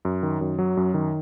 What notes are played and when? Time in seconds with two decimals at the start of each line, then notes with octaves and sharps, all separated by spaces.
0.05 F#2
0.23 D#3
0.41 F#2
0.59 F#3
0.77 F#2
0.94 D#3